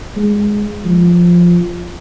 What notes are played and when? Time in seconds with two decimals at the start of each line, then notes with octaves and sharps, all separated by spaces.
0.16 G#3
0.85 F3